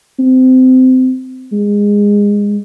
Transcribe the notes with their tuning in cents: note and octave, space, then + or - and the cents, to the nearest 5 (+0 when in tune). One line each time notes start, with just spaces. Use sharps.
C4 -25
G#3 -20